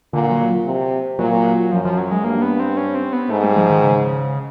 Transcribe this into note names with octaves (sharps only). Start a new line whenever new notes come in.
A#2 D3
F#3
C3
A#2 F#3
F#2 F3
F3
F#3
G#3
G2 A#3
B3
C4
C#4
C4
B3
G#2 A3
G3
F3
D#3
C#3